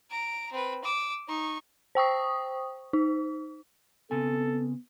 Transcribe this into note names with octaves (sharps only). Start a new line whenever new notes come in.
A#5 D7
C4 B4
D6 E6
D#4 C#6
C5 G5 C#6 D#6
D#4
C#3 B3 C4 A4 G#5